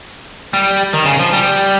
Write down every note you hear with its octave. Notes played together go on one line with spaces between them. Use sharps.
G3
D#3
C#3
F3
G3